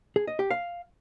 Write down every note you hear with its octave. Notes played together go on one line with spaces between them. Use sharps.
G#4
D#5
G4
F5